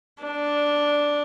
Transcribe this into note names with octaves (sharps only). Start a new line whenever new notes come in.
D4